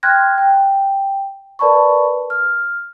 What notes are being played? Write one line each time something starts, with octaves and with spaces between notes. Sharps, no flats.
G5 C6 F6 F#6 G#6 A#6
G5
A#4 B4 D5 A5 B5 C#6
F6